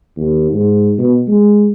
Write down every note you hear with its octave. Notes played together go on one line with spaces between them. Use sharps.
D#2
G#2
B2
G#3